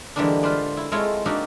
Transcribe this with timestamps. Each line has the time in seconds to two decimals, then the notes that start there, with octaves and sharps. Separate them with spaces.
0.16 D3 E3 G3 G#3 A#3 D4
0.43 F4 B4 C5 D5
0.77 E4
0.92 G#3 A3 C4 E4 F4 C#5
1.26 A#3 D4 D#4 F#4 G4 A4